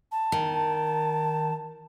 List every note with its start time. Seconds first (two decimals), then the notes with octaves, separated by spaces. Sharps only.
0.12 A5
0.32 D#3